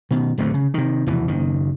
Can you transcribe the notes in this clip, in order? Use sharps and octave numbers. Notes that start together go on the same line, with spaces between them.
B2 D#3
D1 F2 D3 A3
C#3
C3 D#3
F1 E2 B2 E3
F#1 D#3